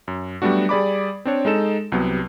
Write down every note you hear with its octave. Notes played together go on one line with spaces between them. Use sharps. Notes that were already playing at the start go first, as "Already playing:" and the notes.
F#2
F#3 G3 A3 B3 D4 F#4
G3 G#4 D5 B5 D6
C4 D4 C#5
G#3 D#4 A4 E7
C2 C3 F#3 B3